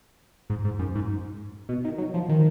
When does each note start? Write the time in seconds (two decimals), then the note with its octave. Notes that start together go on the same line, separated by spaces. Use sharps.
0.50 G#2
0.64 G#2
0.79 F#2
0.95 G#2
1.69 B2
1.84 D#3
1.98 F#3
2.14 F3
2.29 D#3